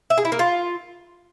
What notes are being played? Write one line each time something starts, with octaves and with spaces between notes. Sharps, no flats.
E5
G#4
E4
A#3
F4